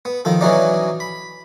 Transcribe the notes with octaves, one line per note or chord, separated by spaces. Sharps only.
B3
D#3 F3 A4
B2 E3 F#3 C#4 D#4 D5
B5